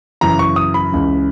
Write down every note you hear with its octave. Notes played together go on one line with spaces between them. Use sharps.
F#2 C#3 E3 A#5
C#6
D#6
B5
C#2 C#3 E3